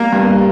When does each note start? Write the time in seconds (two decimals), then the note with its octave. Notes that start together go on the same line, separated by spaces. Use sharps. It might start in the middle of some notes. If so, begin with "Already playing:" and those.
Already playing: G3 A#3 A#4
0.13 G2